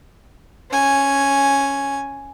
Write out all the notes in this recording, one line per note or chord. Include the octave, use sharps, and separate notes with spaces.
C#4 G#5